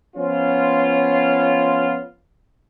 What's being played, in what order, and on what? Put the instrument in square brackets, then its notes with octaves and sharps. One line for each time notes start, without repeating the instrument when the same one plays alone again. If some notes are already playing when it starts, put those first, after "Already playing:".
[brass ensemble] F3 B3 C#4 F4